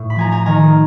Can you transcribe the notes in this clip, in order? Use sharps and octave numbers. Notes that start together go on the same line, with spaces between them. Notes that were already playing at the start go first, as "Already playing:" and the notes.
Already playing: A2
B5
F3 G#5 A#5
G#5 A#5
D#3 G#5 A#5